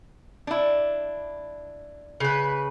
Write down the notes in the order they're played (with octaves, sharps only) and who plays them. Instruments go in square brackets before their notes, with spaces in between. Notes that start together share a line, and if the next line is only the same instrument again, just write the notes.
[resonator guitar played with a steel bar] D4 E4
[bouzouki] C#3 B4